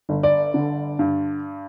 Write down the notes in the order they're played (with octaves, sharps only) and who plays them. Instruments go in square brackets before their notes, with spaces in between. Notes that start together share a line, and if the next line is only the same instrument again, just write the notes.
[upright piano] G1
D5
D3
G2